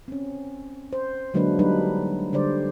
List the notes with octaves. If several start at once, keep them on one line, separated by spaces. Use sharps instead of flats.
C4 C#4
C5
D3 F#3 G#3 A#3 D4 B4
F#3 G3 D4 D#4 B4
D3 G3 C5 D5